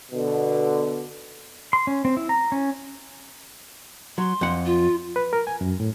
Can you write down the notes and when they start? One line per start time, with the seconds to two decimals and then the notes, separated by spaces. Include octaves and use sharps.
0.12 B2 D3
1.73 C6
1.87 C#4
2.05 C4
2.17 E4
2.29 A#5
2.52 C#4
4.18 F#3 C6
4.41 F2 F#5
4.66 F4
5.16 B4
5.33 A#4
5.47 G#5
5.61 F#2
5.80 A2